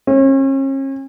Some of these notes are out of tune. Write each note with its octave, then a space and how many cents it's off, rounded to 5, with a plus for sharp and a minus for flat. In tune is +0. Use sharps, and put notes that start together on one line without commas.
C#4 -40